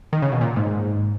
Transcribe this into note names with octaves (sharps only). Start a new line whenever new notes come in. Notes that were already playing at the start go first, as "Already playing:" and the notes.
D#3
C#3
B2
A#2
G#2